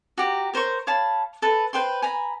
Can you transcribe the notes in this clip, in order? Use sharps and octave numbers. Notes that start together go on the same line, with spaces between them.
F#4 G4 A#5
A#4 C5 C#5 C#6
C#5 F5 A5 B5
A4 B4
B4 C5 G5 C6
G#5 A#5 B5